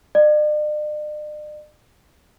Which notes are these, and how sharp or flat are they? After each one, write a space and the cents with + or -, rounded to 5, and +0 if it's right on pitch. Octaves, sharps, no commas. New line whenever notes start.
D5 +45